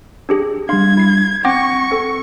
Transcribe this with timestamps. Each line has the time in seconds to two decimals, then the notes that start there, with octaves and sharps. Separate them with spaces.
0.29 D4 G4 G#4
0.69 G3 D4 F5 C6 G#6
0.97 E4 C7
1.45 C4 F#5 G5 C#6 D6 A#6
1.91 C4 A4